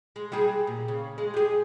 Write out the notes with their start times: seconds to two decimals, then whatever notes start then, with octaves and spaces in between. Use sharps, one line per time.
0.16 G#3
0.32 G3 F#4 G#4
0.67 A#2
0.88 C#3
1.18 G#3
1.34 G4 G#4